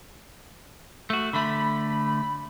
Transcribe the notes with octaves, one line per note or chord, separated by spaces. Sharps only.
A3 F#4
D3 A3 B5